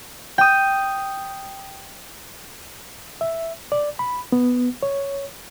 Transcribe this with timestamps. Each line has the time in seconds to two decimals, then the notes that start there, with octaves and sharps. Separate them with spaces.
0.38 G5 D#6
3.21 E5
3.72 D5
3.99 B5
4.32 B3
4.83 C#5